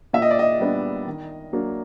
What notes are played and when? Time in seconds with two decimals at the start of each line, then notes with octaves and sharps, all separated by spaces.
0.13 A#2 E5
0.22 D#5
0.31 D5
0.39 D#5
0.60 G3 B3 D4
1.06 D#3
1.53 F#3 A#3 D4